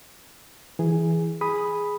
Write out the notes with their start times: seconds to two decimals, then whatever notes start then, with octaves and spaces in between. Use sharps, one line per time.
0.79 E3 G#4
1.41 G#4 B5 D#6